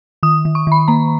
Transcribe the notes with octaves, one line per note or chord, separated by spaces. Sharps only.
D#3 D#6
D#3
C#6
D#3 B5
A#3 A#5